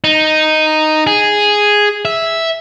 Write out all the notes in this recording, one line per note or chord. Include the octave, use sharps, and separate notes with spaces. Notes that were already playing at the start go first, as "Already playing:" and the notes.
D#4
G#4
E5